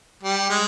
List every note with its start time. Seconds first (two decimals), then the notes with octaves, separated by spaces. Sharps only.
0.23 G3
0.50 G#3